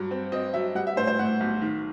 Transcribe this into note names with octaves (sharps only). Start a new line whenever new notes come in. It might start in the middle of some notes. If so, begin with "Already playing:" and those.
Already playing: G2 F#3
C4
C4 D#5
F#3 E5
G3 F#5
E5
A2 C5
C5
A2 F#5
B1
D#3